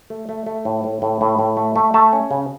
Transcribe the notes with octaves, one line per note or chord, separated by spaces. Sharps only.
A3
A3
A3
A2
A2
A2
A2
A2
A3
A3
A3 A5
C#4
C#3